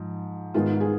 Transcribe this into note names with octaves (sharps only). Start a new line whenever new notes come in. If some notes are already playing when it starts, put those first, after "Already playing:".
Already playing: G#2 F3
G#2 D#3 G#3 B3 F4
G#4